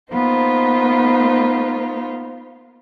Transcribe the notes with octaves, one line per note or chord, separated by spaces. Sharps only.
A#3 B3 D#4 F4 C5